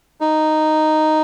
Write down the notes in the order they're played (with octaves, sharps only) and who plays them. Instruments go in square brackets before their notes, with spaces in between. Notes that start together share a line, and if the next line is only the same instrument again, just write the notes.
[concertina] D#4